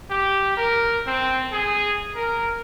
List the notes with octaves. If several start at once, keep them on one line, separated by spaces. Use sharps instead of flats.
G4
A#4
C4
G#4
A#4